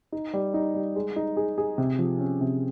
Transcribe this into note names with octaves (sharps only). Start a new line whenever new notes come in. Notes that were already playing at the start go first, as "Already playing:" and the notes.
D#4
G3
D#4
G3
G#3
D#4
G#4
G#4
C3
F3
C#4
C3